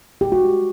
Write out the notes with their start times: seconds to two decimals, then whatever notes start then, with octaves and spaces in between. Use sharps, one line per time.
0.21 G4
0.32 G#3 F#4